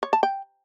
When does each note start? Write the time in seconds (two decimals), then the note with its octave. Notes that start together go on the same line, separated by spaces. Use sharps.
0.03 C#5
0.13 A5
0.23 G5